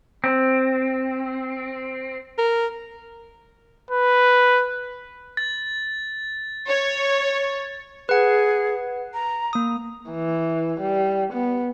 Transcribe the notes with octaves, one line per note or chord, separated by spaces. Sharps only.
C4
A#4
B4
A6
C#5
G#4 B4 F#5
A#5
A#3 D#6
E3
G3
B3